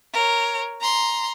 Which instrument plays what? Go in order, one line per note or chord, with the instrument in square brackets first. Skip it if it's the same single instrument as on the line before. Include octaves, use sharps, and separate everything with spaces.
[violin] A#4 C#5
A#5 C6